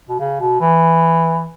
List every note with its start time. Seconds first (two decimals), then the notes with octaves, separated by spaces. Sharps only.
0.09 B2
0.19 C#3
0.40 B2
0.60 E3